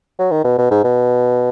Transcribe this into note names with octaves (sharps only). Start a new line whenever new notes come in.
F#3
D#3
B2
B2
G#2
B2